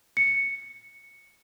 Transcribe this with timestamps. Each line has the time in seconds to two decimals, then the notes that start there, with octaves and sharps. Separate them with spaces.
0.17 C#7